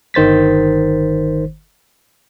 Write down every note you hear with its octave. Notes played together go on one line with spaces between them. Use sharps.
G1 D#3 C5 A6 B6